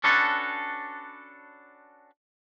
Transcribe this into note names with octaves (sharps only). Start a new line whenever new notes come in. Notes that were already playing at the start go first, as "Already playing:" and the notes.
C#4 D4 F#4 A4 B4 C#5